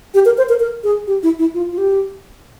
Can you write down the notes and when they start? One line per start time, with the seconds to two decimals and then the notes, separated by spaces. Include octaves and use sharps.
0.14 G4
0.25 A#4
0.38 C5
0.49 A#4
0.60 A#4
0.84 G#4
1.07 G4
1.23 E4
1.39 E4
1.54 F4
1.72 F4
1.78 G4